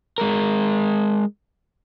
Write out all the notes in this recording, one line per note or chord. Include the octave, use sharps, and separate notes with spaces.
G#3 A#4